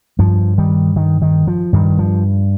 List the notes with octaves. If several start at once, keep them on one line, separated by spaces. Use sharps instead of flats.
G2 F3
D#3 G3
D#3
D#3
F3
G2 D#3
F3